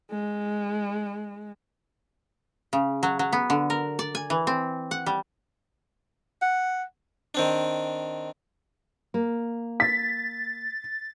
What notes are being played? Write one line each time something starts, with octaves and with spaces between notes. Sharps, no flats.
G#3
C#3
F#3
F#3
B3
D3
A#4
D5
G#5
E3
C4
F#5
G3
F#5
D#3 C4 D4
A#3
A6 B6